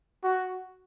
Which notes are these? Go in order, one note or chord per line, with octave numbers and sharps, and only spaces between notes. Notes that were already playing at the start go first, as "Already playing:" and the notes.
F#4